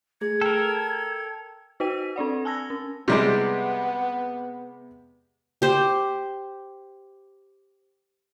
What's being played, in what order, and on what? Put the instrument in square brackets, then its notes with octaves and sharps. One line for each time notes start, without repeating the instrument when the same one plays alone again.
[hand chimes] A3 G#4 [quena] G#6
[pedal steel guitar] A4 A#4 [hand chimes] G5
[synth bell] D#4 F#4 B4 G5 B6 D#7
C4 D4 D5 F#5
G#5 A5 E6 G#6 A#6
C#4
[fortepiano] C3 G3 G#3 [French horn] B3
[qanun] G4 C5